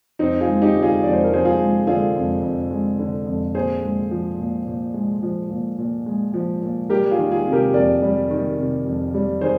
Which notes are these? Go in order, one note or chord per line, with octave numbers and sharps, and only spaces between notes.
F2 C4 D#4
F4 G#4
G#3
D#4 G4
D3
F4 G#4
F2 D5
C5
A#4
F2 G#4 C5
F4 G#4
G#3
D3 F4 G#4
F2
F2
G#3
D3
F2
A#2 G#4 C5
G#3
F3
A#2
A#2
G#3
F3
A#2
A#2
G#3
F3
A#2
G3 G4 A#4
F4 G#4
D#3
F4 G#4
C3
G4 A#4
F2 A#4 D5
G3
D#3
C3
F2
G3
D#3 G#4 C5